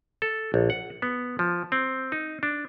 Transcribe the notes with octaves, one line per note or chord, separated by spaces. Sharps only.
A4
A#1
F#5
B3
F3
C4
D#4
D4